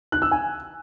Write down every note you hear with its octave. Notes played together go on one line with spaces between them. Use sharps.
F#6
E6
G#5